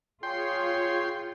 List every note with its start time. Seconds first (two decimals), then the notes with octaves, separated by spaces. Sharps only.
0.23 F4 G#4 C#5 G5 C6